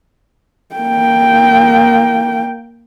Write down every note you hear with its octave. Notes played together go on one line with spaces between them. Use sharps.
A#3 G5